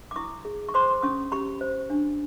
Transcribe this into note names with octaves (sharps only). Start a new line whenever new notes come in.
D6
E4 C#6 D#6
G#4
C#6
C5 C6 D6
C#4 C#6 D#6
G4 B5 C#6
C5
D4